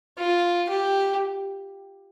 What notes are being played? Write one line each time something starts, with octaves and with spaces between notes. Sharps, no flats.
F4
G4